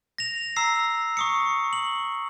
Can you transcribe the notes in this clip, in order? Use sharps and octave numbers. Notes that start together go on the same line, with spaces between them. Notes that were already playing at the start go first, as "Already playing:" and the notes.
A#6 F7
A#5 E6 C7
C#6 D#6 C#7
F#7